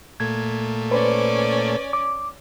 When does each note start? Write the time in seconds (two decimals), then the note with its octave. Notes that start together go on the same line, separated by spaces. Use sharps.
0.20 A#2 A3 G#6
0.91 C#4 B4 C5 D5
1.93 D6